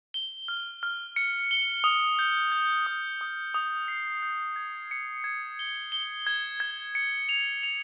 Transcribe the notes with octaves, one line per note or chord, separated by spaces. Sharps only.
G7
F6
F6
C#7
G7
D#6
G6
G6
D#6
D#6
D#6
C7
G6
G#6
C#7
G#6
G7
G7
G#6
G#6
C#7
F7
F7